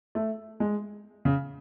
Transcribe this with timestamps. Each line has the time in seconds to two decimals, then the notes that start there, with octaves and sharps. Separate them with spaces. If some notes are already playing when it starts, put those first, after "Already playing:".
0.15 A3
0.60 G#3
1.25 C#3